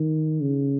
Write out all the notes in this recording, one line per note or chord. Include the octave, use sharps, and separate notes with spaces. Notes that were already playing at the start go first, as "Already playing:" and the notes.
Already playing: D#3
C#3